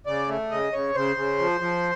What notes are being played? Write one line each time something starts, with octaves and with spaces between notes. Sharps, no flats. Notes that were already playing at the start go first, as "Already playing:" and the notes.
C#3 D5
A3
C#3 D#5
C#3 C#5
C#3 C5
C#3
F3
F3